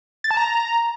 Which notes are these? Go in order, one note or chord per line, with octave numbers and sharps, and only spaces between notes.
A6
A5
A#5